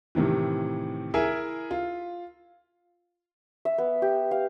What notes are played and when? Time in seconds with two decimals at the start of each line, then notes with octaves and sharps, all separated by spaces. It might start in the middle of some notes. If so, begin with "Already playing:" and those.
0.15 A2 C3 D#3 E3
1.14 E4 G#4 A#4 E5 G#5
1.71 F4
3.65 E5
3.78 B3
4.02 G4
4.31 F5